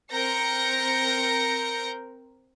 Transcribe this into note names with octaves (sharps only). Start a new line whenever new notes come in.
C4 A#4 G6 A#6 C#7